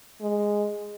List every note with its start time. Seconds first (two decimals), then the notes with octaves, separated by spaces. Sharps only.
0.21 G#3